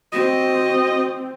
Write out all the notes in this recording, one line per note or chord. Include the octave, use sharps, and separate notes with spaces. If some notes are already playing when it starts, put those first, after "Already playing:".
C4 F#4 D#5